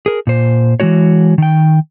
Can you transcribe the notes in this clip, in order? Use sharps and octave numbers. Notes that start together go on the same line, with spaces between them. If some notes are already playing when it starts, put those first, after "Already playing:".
G#4 A#4
A#2 C5
E3 F3 G#3 F#4 C#5
D#3 G5